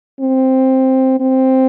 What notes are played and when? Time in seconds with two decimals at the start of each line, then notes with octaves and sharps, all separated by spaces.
0.21 C4
1.20 C4